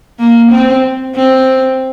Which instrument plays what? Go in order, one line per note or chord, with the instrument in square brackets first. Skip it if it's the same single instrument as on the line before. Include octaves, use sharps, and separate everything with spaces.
[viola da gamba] A#3
C4
C4